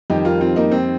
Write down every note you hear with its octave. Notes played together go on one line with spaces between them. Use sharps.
F2 D#3 G3 D#4 G4
F4 A#4
C4 F4
A#3 D#4
C4